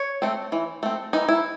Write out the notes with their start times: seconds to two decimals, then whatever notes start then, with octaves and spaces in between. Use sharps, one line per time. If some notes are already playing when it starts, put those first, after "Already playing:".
Already playing: C#5
0.22 A3 C4
0.52 E3
0.83 A3 C4
1.13 E3 D#4
1.29 E4